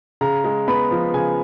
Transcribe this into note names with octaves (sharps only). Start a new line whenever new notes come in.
C#3 A#5
G#3
B3 B5
F3
C#3 G#5